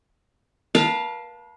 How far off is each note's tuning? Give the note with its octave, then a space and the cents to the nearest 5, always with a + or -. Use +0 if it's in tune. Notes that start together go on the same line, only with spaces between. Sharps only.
B4 -45 F5 +0 A5 +0